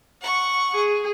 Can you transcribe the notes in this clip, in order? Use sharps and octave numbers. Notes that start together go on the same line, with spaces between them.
F#5 C#6
G#4